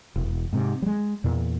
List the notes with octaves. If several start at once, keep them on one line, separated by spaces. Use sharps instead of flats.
E1
G#2 C3
G3 G#3
E2 A#2